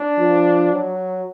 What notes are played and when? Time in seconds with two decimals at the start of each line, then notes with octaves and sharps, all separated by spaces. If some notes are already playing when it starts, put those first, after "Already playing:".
Already playing: D4
0.18 F3
0.73 F#3